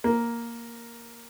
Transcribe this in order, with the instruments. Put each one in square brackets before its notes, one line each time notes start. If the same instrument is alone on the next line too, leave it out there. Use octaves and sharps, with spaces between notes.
[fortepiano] A#3